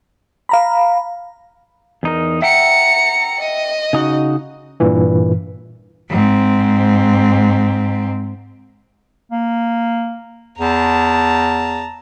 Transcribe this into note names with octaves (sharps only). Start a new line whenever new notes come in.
F5 A#5 B5
E2 D#4 A#4
E5 F#5 G5 A#5 C#7
D#5
C#3 D#4 F#4
G2 A#2 E3
G#2 C4
A#3
E2 A5 A#5